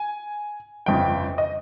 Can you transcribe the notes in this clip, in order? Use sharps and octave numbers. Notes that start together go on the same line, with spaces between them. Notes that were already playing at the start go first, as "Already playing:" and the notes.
Already playing: G#5
G1 F2 C#3 G5
D#5